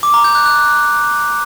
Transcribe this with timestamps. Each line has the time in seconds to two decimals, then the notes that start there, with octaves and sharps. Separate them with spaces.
0.03 D6
0.14 A#5
0.24 G6
0.35 F#6
0.46 F#6